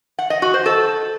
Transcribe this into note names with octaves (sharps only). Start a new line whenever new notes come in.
F#5
D#5
F#4
C5
A4